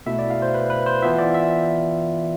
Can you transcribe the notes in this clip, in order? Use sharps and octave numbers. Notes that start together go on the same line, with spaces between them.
B2 A3 E4 E5
D5
F5
C5
B4
B4
C5
E3 B3 F4 E5
D5
E5